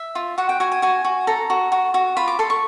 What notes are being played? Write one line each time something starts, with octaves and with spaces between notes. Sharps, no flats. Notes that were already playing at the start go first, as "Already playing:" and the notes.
Already playing: E5
F4
F#4 F#5
G5
F#4 G#5
G#5
F#4 G#5
F#4
A4 A#5
F#4
F#4
F#4
F4 B5
D6
A4 C6
C#6